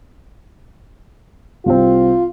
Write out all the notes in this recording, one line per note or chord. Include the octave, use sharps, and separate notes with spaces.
C2 C4 F4